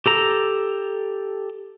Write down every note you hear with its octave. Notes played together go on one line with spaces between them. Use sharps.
G4 A4 A#5